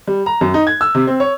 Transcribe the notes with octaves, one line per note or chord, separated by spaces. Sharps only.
G3
A#5
F#2
D#4
G#6
E6
C3
C4
C#5